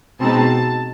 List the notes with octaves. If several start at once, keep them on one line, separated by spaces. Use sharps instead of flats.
B2 G#3 C4 D#4 A5